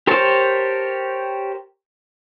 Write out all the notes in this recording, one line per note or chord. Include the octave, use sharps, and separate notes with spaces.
G4 A#4 C5 C#5 A5